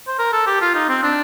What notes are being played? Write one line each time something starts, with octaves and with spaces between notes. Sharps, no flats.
C5
A#4
A4
G4
F4
D#4
C4
D4